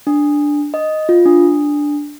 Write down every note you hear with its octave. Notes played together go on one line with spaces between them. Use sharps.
D4
D#5
F4
D4